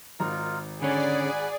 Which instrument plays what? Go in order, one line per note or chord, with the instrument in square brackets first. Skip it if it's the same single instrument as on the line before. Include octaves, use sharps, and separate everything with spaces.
[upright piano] G#1 A#5 [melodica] D#4 F4 A#4
[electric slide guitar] D3 C#4 [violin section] G#4 D5 [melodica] F#5 G#5 B5